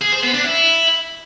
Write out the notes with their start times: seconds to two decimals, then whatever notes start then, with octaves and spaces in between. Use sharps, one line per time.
0.01 G#4
0.12 C5
0.23 B3
0.34 D4
0.45 E4